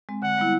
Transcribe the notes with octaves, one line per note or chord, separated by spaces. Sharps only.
G#3 C4
D3 F#5
G3 B3 E4